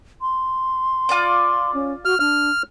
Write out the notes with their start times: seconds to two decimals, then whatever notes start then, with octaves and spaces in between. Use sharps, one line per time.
0.21 C6
1.09 F4 D5 D6
1.74 C#4
2.05 F#4 F6
2.20 D4 F6